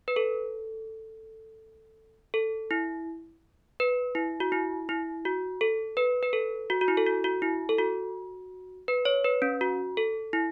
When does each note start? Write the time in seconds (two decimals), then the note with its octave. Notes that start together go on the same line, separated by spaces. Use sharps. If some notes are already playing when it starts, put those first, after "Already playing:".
0.08 B4
0.16 A4
2.34 A4
2.71 E4
3.80 B4
4.15 E4
4.40 F#4
4.52 E4
4.89 E4
5.25 F#4
5.61 A4
5.97 B4
6.23 B4
6.33 A4
6.70 F#4
6.81 F#4
6.88 E4
6.97 A4
7.07 F#4
7.24 F#4
7.42 E4
7.69 A4
7.79 F#4
8.88 B4
9.05 C#5
9.24 B4
9.42 C#4
9.61 F#4
9.97 A4
10.33 E4